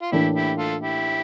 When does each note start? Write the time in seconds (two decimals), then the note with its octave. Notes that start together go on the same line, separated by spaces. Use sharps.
0.02 F4
0.11 A2 E3 A#3 D4 E4 G4
0.35 E4 G4
0.58 F4 A4
0.81 E4 G4